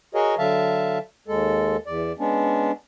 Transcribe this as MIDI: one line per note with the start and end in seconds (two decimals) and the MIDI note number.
0.15 0.35 66
0.15 0.35 68
0.15 0.35 70
0.15 0.35 73
0.15 0.35 75
0.38 0.98 50
0.38 0.98 54
0.38 0.98 76
0.38 0.98 77
0.38 0.98 81
1.28 1.77 39
1.28 1.77 56
1.28 1.77 69
1.86 2.12 40
1.86 2.12 74
2.19 2.71 56
2.19 2.71 59
2.19 2.71 61
2.19 2.71 62